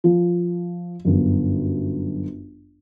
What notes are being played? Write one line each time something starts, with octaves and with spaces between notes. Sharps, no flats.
F3
G1 F#2